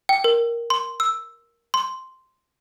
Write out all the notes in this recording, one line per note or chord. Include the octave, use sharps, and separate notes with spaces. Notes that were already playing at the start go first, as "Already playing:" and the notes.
G5
A#4
C6
E6
C6